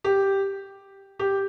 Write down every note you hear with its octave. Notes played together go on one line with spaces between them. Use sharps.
G4
G4